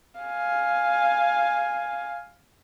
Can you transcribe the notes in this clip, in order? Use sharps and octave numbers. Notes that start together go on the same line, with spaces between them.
F5 G#5